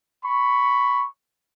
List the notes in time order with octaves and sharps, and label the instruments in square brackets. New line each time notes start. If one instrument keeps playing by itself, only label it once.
[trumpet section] B5 C#6